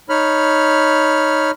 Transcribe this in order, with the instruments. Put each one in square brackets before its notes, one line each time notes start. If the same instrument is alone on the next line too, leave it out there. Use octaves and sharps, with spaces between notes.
[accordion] D#4 C#5 B5 F6